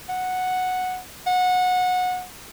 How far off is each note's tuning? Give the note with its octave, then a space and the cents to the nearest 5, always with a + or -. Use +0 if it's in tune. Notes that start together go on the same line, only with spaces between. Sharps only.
F#5 -5
F#5 -20